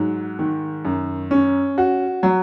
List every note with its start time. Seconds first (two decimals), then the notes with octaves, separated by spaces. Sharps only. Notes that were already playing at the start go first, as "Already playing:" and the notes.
Already playing: G#2 F#3
0.39 D#3
0.85 F#2
1.31 C#4
1.78 F#4
2.23 F#3